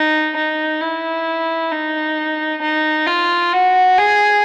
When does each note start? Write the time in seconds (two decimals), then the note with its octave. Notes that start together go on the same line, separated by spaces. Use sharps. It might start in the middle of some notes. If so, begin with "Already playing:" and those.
Already playing: D#4
0.36 D#4
0.81 E4
1.72 D#4
2.62 D#4
3.07 F4
3.53 F#4
3.98 G#4